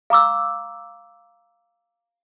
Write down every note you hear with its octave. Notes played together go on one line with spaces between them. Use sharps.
F5 A#5 D6 E6